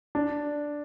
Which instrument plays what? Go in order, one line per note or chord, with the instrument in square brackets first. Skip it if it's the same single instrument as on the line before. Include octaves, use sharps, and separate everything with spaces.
[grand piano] D4